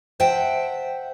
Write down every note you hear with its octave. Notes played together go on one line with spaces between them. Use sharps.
C5 E5 F#5 G5 A5